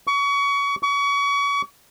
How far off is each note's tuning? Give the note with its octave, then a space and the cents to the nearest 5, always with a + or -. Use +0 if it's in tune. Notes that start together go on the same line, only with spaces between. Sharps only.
C#6 +30
C#6 +35